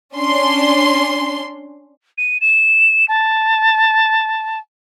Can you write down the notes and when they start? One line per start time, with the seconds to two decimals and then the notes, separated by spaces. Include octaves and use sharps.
0.14 C#4 D4 C6
2.17 D#7
2.41 E7
3.08 A5